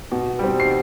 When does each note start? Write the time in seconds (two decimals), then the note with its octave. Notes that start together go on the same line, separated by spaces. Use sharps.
0.12 B2
0.39 G3 C4
0.60 C7